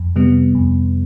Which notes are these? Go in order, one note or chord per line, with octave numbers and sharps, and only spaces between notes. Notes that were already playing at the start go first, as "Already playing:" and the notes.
Already playing: F2
C3 G3 B3
F2